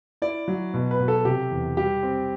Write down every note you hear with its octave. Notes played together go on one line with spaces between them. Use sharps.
E4 D5
F#3
B2
B4
B2
A4
C3 G4
E2
G3 G4
C4